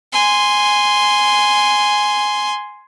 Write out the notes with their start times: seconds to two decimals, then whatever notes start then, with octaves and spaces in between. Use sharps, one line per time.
0.13 G#5 C6